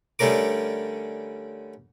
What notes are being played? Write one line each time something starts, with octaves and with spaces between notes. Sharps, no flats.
D3 G3 A3 C#4 A#4 D6